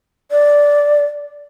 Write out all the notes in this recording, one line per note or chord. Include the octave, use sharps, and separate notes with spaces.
D5